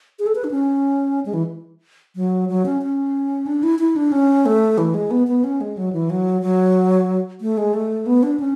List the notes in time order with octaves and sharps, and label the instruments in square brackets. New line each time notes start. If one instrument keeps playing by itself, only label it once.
[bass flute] G#4
A4
B4
D4
C#4
G#3
E3
F#3
F#3
C#4
C#4
D4
E4
E4
D4
C#4
A3
E3
G#3
B3
B3
C#4
G#3
F#3
E3
F#3
F#3
A3
G#3
A3
B3
D4
C#4